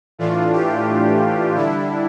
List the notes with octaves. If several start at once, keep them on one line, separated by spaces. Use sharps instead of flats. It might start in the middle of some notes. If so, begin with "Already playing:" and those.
A2 E3 A3 D4 F4
G4
D3 G3 D4 E4